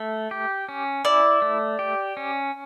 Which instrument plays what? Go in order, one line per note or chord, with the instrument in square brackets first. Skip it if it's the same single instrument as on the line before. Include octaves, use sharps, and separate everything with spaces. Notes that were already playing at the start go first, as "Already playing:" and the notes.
Already playing: [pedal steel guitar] A3
G4
C#4
[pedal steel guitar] E4 [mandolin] D5
[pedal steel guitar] A3
G4
C#4